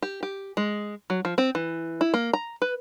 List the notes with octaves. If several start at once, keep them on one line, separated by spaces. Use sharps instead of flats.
G4
G4
G#3
F#3
F3
C4
E3
E4
A#3
A#5
B4